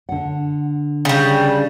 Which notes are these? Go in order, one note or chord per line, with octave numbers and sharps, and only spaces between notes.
D3 F#5
C#3 G3